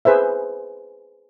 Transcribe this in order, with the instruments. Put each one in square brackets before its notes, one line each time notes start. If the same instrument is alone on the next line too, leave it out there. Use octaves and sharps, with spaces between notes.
[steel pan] G#4 B4 C5 E5